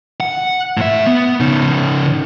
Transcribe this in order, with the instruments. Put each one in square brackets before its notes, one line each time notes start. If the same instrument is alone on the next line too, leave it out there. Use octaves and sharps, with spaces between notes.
[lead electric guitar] F#5
A2 E5
B3
C#3 D#4